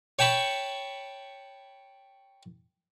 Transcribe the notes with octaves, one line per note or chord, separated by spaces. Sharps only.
C#5 G5 A5 B5 C#6